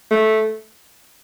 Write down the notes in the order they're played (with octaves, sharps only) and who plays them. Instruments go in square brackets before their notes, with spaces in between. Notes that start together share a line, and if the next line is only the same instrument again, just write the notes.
[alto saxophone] A3